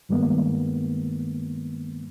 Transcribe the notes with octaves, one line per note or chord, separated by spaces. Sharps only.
G2 D#3 G3 G#3 A#3 B3